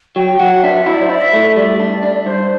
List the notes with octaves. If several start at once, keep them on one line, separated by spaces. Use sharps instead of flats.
F#3 G5
F#3 F#5
D4 E5
E4 E5
D5
C5
E4 D5
E5
A3
G3 D5
D4
D4
G2 C5